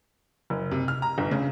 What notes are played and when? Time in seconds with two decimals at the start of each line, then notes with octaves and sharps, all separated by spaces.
0.50 F#1
0.71 C3
0.88 F6
1.02 A#5
1.18 G1
1.31 C#3